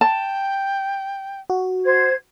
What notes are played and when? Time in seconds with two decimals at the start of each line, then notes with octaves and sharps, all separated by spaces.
0.01 G5 A5
1.50 F#4
1.84 C5 G#6